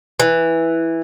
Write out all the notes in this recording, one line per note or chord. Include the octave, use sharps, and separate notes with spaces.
E3